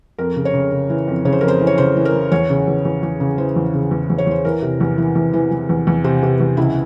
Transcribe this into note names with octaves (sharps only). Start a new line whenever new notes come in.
F2 A#4
C#3
C#5
C#3
C#3
E3
F2
C#3 C#5
C5
F2 A#4
C5
E3
C#5
C#3 C5
E3
A#4
E3
E2 C#5
C#3
E2
E2
E2
C#3
E3 C5
E2
C#3
E2
E2
C#5
E2 C5
E3 A#4
C3
E2
E3
E2
E3
E3
E2
E2
C3 C5
C3
E2
C#2 E4